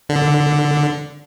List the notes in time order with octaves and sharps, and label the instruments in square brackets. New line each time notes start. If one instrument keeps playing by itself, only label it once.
[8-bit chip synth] D3